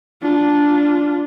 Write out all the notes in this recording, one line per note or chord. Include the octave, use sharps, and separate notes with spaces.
D4 F4